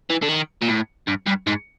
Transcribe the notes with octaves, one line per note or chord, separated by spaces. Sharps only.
E3
D3
D#3
A#2
A2
G2
G2
G#2